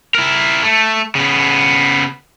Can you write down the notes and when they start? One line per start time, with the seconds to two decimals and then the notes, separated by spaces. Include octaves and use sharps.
0.15 E4 A#4
0.63 A3
1.15 C#3 B3